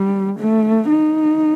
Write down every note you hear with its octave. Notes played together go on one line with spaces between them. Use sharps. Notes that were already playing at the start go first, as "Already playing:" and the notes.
Already playing: G3
A3
D#4